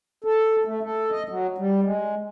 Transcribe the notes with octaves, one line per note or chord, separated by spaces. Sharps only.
A4
A3
A4
D#5
F#3
G3
G#3